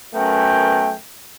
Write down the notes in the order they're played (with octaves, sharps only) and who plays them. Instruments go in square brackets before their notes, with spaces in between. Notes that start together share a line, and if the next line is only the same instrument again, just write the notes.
[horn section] F#2 A3 B3 A#4 G5